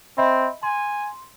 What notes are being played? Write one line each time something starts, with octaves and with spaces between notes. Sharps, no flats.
C4 D#5 E5 B5
G#5 C6